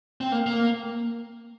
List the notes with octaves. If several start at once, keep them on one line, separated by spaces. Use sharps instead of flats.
C4
A#3
A#3